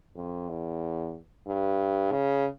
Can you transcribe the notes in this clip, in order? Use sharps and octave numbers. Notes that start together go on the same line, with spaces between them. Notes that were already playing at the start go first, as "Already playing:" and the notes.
F2
E2
G2
C#3